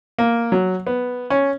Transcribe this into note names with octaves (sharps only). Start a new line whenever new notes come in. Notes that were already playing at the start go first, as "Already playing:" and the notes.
A#3
F#3
B3
C#4